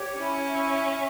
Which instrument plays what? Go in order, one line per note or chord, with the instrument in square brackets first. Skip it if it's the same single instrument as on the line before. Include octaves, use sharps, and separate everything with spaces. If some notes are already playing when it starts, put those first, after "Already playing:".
Already playing: [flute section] G4 C#5
[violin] C#4 [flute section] E4
[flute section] E4
E5
E5